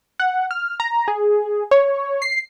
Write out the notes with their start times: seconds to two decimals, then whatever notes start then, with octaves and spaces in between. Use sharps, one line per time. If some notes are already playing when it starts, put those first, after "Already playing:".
0.20 F#5
0.51 F6
0.80 A#5
1.08 G#4
1.71 C#5
2.22 C7